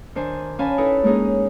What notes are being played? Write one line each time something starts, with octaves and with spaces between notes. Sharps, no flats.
D#3 D4 C5 G#5
C#4 F5 G#5 A5 B5
D#4 E4 A4 B4
G#3 A#3 C#4 D#4 G#4